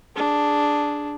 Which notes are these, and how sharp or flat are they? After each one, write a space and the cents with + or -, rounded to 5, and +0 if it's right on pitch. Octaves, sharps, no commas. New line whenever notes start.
D4 +0 G#4 +0